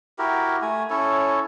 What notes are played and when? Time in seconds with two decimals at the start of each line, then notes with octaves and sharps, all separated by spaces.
0.18 E4 F#4 G4 A#4
0.62 A3 G#5
0.90 C#4 E4 A4 C#5